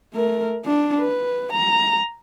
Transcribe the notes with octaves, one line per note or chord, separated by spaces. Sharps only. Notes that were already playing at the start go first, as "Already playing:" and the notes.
A3 A#4
D4
B4
A#5